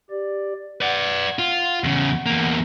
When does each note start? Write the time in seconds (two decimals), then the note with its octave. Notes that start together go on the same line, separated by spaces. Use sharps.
0.10 G4 D5
0.81 B4 D5 F#5
1.39 F4
1.84 E2 C#3
2.26 E2 A#3